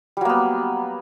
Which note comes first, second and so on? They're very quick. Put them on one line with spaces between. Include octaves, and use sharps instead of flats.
G3 F#3 A#3 B3